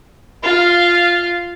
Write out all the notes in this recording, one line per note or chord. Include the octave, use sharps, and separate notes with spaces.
F4 F5